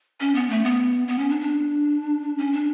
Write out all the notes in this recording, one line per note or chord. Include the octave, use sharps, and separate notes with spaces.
C#4
B3
A3
B3
B3
C#4
D4
D4
C#4
D4